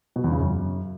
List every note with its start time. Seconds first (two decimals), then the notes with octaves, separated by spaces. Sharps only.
0.16 B2
0.24 E2
0.32 C#3
0.40 F#2